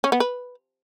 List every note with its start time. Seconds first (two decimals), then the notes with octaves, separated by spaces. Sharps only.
0.04 C#4
0.12 B3
0.20 B4